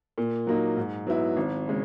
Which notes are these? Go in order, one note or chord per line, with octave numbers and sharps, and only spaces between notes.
A#2
F#3 A#3 D#4
G#2
F#3 B3 E4
G#1
C#3 G#3